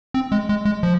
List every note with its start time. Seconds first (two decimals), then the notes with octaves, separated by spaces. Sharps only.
0.14 C4
0.32 G#3
0.49 G#3
0.65 G#3
0.83 F3